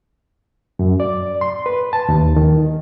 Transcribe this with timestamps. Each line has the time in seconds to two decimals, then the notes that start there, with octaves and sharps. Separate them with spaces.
0.79 F#2
1.00 D5
1.41 C6
1.66 B4
1.93 A5
2.09 D#2
2.36 D#3